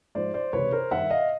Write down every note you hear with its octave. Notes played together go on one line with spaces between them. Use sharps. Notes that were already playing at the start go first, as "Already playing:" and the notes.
G#2 F3 C5 D5
C5 D5
C#2 C3 E3 B4 C#5
A#4 C5
G2 D#3 E5 F#5
D#5 F5